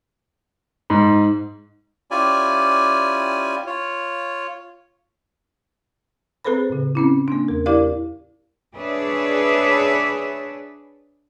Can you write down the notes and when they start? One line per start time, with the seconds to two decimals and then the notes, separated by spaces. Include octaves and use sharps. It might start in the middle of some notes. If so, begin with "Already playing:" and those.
0.90 G#2
2.11 C#4 E4 F4 G4 D5 G#5
3.66 F4 C#5
6.44 C4 G#4 A4 B4 C5 B5
6.70 A2 C#3
6.95 C4 C#4 E4
7.28 A#3 D4
7.48 E2 A#4
7.66 E4 G4 A#4 D5 F5
8.77 D4 G#4 B4 C#5 D5 E5